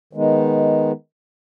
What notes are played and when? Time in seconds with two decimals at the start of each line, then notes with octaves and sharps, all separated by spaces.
0.13 D#3 G#3 B3 D#4